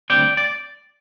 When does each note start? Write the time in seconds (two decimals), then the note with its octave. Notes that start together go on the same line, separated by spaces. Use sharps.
0.10 D2 C3 G3 C4 D5 G5
0.37 D5